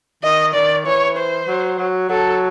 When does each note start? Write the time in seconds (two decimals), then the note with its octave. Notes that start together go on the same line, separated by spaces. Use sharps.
0.24 D#3 D#5
0.54 D#3 D5
0.86 E3 C#5
1.17 C5
1.48 F#3
1.78 F#3
2.09 F#3 A4